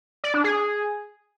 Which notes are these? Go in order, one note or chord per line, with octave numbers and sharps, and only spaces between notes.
D5
D4
G#4